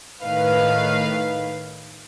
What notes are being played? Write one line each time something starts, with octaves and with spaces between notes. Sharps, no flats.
A2 D#3 B4 F5